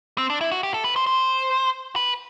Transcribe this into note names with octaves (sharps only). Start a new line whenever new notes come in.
C4
D4
E4
F#4
G4
A4
B4
C5
C5
B4